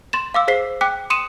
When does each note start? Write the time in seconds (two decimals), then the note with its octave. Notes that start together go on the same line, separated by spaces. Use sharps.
0.13 C6 A6 E7
0.34 F5 D6 E6
0.48 G#4 C5 B6 C7
0.81 G5 D6 F#6 B6
1.10 C6 D#6 C#7 D#7 E7